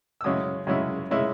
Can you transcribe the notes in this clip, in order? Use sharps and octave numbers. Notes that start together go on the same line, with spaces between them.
E6
F#2 C#3 G#3 C#4 E4 D#6
F#2 C#3 G#3 C#4 E4
C#3 G#3 C#4 E4